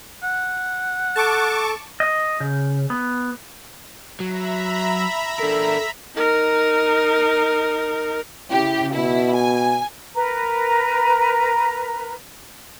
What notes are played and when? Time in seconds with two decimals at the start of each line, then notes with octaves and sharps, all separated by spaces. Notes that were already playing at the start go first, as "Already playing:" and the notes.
0.23 F#5
1.16 A4 A5 C#6 D6
2.00 D#5
2.40 C#3
2.90 B3
4.20 F#3 E5 A#5 B5
5.39 D4 A4 A#4
6.16 D#4 A#4
8.51 C#3 E4 G4
8.94 B2 E4
9.35 G#5
10.15 A#4 B4 A#5